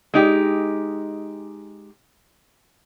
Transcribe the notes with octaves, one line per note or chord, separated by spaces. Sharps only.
G#3 D#4 G4